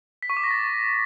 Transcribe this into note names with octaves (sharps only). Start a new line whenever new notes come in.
B6
C#6
D6
A#6
A6